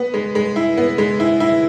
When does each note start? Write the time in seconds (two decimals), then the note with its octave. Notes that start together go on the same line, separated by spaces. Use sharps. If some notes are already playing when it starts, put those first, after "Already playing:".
Already playing: B3
0.14 G#3
0.35 G#3
0.56 E4
0.77 B3
0.98 G#3
1.20 E4
1.40 E4